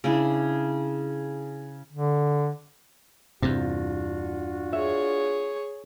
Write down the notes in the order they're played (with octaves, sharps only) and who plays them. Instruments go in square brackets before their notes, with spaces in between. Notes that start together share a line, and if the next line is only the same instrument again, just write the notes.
[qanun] C#3 D4 E4
[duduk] D3
[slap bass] E2 G2 [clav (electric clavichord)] C3 [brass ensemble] D4 F4 F#4
[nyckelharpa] G#4 C#5 [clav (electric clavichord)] E5